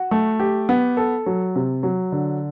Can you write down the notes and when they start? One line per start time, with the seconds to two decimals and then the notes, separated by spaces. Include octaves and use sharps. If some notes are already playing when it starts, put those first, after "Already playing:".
Already playing: F#4
0.11 A3
0.39 G4
0.69 B3
0.97 A4
1.26 F#3
1.55 C3
1.83 F#3
2.12 D3